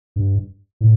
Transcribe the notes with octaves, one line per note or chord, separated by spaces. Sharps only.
G2
A2